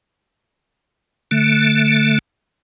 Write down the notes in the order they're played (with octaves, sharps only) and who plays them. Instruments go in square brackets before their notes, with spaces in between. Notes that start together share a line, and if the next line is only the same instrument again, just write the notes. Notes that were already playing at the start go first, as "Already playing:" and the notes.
[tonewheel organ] D3 A3